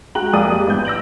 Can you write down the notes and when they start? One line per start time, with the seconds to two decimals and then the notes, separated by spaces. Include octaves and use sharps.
0.15 G#3 F#4 G5 A#5 F#6 F#7
0.33 F2 A#3 G#4 D5 D#6 D#7
0.51 G3
0.67 A1 B3 G6
0.85 E6 A#6 D7 F#7